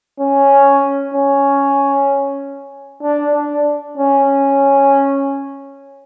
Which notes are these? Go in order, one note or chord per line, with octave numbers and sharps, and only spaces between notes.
C#4
C#4
D4
D4
C#4